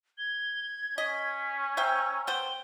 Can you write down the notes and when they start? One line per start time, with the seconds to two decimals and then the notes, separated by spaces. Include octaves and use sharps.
0.18 G#6 G7
0.98 C#4 D#5 B6
1.77 C5 E5 G5 A#5 E6
2.27 B3 C5 G5 G7